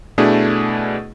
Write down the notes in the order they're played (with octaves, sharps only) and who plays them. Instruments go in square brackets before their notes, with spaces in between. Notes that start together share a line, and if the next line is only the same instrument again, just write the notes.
[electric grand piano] B2 A3 D4 E4 G#4